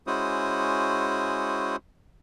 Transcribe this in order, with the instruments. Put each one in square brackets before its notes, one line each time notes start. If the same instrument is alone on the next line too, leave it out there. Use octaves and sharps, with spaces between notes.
[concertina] G#3 C#4 E4 F#4 C5 D#6